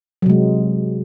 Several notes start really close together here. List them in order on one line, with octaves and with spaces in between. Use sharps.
F#3 C3 G#3